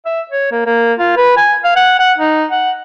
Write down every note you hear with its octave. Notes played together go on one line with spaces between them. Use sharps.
E5
C#5
A#3
A#3
F4
B4
G#5
F5
F#5
F#5
D#4
F#5